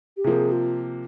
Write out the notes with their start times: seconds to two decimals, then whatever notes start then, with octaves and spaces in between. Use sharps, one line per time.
0.17 G4
0.24 C3 F3 A#3 G#4
0.52 F4